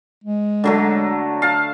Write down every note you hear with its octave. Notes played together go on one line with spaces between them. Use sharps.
G#3
D3 F#3 A3
F5 A5